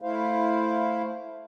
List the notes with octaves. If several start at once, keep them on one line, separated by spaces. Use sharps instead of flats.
A3 E4 C5 F5